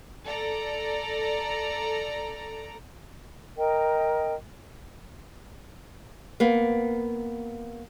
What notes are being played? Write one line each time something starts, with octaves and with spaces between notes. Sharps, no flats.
A4 D5 A#5
A#4 D#5 G5
A#3 B3